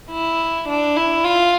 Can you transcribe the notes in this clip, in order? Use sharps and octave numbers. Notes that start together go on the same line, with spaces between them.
E4
D4
E4
F4